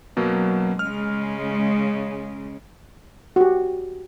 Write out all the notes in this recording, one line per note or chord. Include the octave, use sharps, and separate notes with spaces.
F#2 B2 F#3 A#3
C#3 G#3 F6
F#4 G4